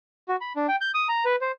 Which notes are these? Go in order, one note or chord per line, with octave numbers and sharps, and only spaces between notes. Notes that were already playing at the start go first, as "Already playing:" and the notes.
F#4
B5
D4
G5
G6
D#6
A#5
B4
C5